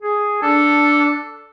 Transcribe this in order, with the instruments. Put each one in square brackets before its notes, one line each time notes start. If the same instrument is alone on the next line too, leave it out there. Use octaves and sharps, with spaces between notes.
[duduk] G#4
[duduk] D4 [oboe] A4